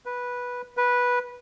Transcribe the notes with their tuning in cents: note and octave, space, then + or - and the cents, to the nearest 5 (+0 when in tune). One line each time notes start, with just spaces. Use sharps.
B4 -10
B4 -10